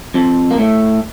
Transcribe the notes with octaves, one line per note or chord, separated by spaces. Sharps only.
F2 F3
A#3
A2 A3